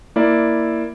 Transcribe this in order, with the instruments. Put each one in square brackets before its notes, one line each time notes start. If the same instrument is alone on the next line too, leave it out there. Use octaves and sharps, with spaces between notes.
[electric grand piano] A#3 E4 D5